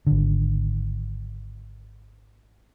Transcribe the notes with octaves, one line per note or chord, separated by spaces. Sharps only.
G#1 D3